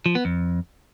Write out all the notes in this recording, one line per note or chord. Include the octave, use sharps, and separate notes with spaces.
F3
B3
F2